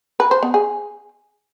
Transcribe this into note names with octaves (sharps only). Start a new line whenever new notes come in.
B4
C5
B3
G#4